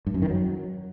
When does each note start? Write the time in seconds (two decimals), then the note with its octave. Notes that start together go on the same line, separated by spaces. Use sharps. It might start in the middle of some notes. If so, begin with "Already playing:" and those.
0.07 G2
0.14 F#2
0.22 D#3
0.30 F#3